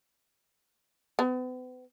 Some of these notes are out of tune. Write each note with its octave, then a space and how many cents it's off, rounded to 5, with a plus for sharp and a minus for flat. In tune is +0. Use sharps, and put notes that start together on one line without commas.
B3 +40